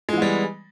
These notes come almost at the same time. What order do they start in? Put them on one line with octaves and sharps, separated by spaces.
G#3 E3 B3 G3